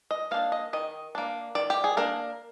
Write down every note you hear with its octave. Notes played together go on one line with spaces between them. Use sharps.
D#5
A#3 D4 F5
D#5
D#3 D#5
A#3 D4
D#3 D5
G4
G#4
A#3 D4 A#4